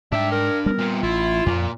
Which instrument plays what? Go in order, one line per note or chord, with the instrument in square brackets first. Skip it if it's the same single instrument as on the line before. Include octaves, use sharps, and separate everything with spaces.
[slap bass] G#2 [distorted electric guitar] D4 G5 [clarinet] E5
[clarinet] A#4
[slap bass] G3 B3 [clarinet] A#4
[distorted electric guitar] A#2 C4
[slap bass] A1 [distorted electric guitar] E4 [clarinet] F4
[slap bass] F2 [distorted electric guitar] A#2